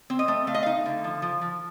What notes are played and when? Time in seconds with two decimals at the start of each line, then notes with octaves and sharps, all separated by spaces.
0.10 C4
0.19 D#5
0.28 A3
0.47 A3 F5
0.54 D#5
0.63 D#4 F5
0.86 D3
1.04 F3
1.22 F3
1.41 F3